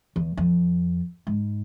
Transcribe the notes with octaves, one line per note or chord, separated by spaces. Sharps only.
E2
F2
G#2